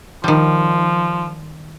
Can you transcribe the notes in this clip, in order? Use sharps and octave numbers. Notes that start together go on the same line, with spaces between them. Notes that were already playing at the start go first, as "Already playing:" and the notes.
D#3 F3 G3